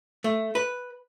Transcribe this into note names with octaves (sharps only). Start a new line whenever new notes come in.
A3
B4